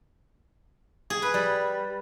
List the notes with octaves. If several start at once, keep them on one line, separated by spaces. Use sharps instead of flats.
G#4
B4
G3